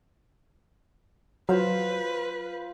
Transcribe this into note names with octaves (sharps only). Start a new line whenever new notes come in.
F#3 F4 B4 C5 F5